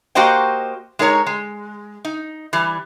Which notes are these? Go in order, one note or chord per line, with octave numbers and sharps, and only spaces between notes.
A#3 F#4 G4 C5 D#5 G5
G#3 D#4 A#4 C#5 A#5
G#3
D#4
E3 G3